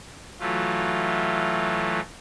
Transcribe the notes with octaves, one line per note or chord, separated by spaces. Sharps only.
E3 F#3 A3 F4